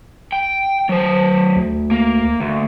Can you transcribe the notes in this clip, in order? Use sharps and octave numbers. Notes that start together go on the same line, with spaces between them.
G5
F#3 C5
D2
A#3
D2